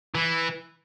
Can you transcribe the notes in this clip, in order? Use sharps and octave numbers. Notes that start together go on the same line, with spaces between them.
E3